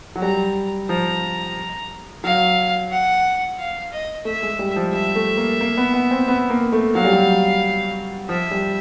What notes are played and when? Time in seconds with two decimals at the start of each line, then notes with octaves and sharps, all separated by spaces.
0.16 F#3
0.21 G3 A#5
0.89 F3 A#5
2.24 F#3 F5
2.92 F#5
3.59 F5
3.92 D#5
4.25 A3 E5
4.43 G#3
4.59 G3
4.76 F3
4.93 G3 E5
5.16 A3
5.37 A#3
5.61 A#3
5.77 B3
5.94 B3
6.11 C4
6.28 B3
6.50 A#3
6.73 A3
6.95 F#3 F5
7.05 G3
7.13 F#3
8.29 F3 E5
8.51 G3